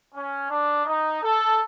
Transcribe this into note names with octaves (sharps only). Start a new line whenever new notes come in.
C#4
D4
D#4
A4